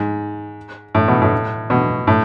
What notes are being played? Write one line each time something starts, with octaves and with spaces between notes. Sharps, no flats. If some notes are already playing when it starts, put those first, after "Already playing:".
Already playing: G#2
A2
B2
A2
B2
A2